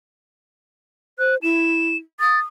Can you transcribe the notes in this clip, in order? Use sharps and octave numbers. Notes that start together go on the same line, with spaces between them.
C5 F#6
E4 E7
D#6 A6